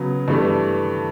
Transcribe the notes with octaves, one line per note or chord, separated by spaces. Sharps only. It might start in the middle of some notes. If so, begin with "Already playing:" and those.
Already playing: C#3 F#3 B3
G2 E3 A3